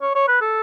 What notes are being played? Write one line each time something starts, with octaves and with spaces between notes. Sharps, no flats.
C#5
C#5
B4
A4